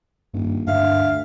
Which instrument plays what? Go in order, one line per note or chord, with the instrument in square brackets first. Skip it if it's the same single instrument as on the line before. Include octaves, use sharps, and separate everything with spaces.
[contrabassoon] D#1 [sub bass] G2
[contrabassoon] D2 [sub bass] G2 [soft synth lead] E5 [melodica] F5